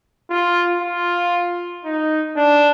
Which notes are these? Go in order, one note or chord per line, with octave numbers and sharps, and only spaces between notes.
F4
F4
D#4
D4